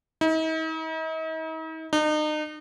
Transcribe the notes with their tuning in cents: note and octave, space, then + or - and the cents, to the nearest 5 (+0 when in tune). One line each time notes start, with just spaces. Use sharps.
D#4 +45
D#4 -35